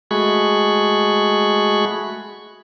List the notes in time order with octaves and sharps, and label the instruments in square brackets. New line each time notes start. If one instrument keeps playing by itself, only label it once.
[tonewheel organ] G#3 A3 F#4 G#4 B5 C#6